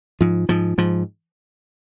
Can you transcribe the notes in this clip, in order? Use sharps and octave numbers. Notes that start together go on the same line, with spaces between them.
G#2 F3
G#2 F3
G#2 F3